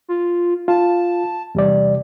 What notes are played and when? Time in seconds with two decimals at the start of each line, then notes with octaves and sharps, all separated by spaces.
0.08 F4
0.68 F4 A5
1.55 E2 C3 G3 D5